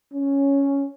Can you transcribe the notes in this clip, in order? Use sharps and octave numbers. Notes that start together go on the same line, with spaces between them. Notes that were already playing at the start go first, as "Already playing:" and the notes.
C#4